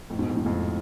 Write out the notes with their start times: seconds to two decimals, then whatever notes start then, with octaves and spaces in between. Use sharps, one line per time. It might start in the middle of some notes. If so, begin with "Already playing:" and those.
0.10 F2 A2
0.19 G#2 B2
0.28 F2 A2
0.37 G#2
0.46 F2 A2